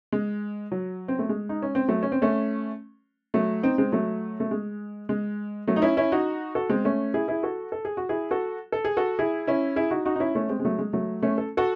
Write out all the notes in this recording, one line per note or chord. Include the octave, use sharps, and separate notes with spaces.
G#3
F#3
C4
A3
G#3
D#4
C#4
C4
F#3 A3
C#4
C4
A3 C#4
F#3 A3
C4 D#4
G#3 C4
F#3 A3
A3
G#3
G#3
F#3 A3
D#4
C#4 E4
C#4 E4
D#4 F#4
F#4 A4
G#3 C4
A3 C#4
E4 G#4
E4 G#4
F#4 A4
A4
G#4
F#4
E4 G#4
F#4 A4
A4
G#4
F#4 A4
E4 G#4
C#4 E4
E4 G#4
D#4 F#4
D#4 F#4
D#4
C#4 E4
A3 C#4
G#3 C4
G#3
F#3 A3
G#3
F#3 A3
A3 C#4
A4
F#4 A4